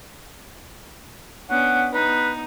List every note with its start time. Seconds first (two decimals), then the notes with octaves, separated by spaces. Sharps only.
1.50 B3 C#4 D4 F#5
1.94 B3 D#4 B4